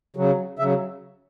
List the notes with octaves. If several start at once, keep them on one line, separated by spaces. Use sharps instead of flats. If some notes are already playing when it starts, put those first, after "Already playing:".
C#3 F#3
C#3 F#3 E5